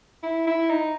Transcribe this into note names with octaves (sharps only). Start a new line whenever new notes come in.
E4
E4
D#4